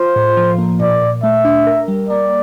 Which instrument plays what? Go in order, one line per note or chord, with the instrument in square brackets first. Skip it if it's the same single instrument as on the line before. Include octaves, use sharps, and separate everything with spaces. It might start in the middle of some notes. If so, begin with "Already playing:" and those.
Already playing: [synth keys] F4 [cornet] C5
[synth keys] A2
F3
A#3
[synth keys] A#2 [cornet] D5
[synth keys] A#2
[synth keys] A3 [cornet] E5
[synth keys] D4
A#4
G3
[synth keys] A#3 [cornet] D5